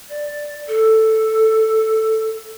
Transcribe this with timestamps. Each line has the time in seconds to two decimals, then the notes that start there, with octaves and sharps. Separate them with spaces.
0.09 D5
0.68 A4